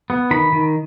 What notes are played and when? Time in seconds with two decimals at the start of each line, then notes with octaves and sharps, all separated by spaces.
0.10 B3
0.31 D#3 B5
0.52 D#3